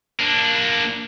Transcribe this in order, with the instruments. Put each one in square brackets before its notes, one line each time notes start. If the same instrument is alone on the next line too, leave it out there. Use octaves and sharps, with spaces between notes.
[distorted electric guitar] A#3 D4